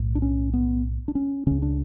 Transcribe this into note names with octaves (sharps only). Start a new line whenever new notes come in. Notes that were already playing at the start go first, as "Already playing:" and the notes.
Already playing: B1 A2
D4
C#4
B3
D4
C#4
C#2 C#3 C#4
D4